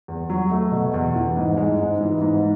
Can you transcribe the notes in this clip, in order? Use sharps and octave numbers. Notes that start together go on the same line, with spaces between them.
E2
F#3
A3
B2
E2
E3
G#2
G#3
G#2
E3
G#2